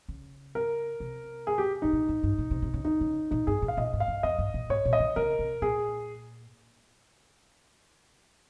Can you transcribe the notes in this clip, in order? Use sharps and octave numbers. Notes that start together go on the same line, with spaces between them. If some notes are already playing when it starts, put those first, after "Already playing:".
C#3
A#4
C3
G#4
G4
G#2 D#4
A#2
G#2
G2
A#2
C3
C3
C#3
D#3 D#4
C#3
A#2 D#4
G2 G#4
A#2
F5
A#2 D#5
G#2
F5
G2
F2 D#5
G2
A#2
G#2 C#5
A#2
D#5
D#3
C#3 A#4
C3
A#2 G#4